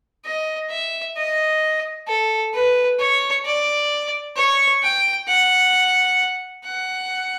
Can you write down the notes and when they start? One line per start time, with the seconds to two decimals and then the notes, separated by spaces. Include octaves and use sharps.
0.25 D#5
0.71 E5
1.17 D#5
2.08 A4
2.53 B4
2.99 C#5
3.45 D5
4.37 C#5
4.82 G5
5.28 F#5
6.65 F#5